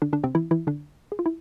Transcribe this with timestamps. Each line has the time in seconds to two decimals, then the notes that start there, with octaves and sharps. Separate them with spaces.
0.02 D3 D4
0.13 D3 D4
0.24 C3 C4
0.35 E3 E4
0.51 E3 E4
0.67 D3 D4
1.12 G#4
1.19 F4
1.26 E4